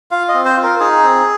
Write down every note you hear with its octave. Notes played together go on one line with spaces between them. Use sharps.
F4 F5
D#5
C4
C5
F4
A#4
D#4 G#4
C4